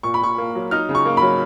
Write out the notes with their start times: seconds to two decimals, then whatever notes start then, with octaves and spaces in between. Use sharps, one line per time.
0.03 A#2 C#6
0.14 B5
0.21 A#2 C#6
0.38 A#3
0.55 F#3
0.71 D#4 F6
0.89 C#3
0.95 C#6
1.05 A#3
1.17 F#3 B5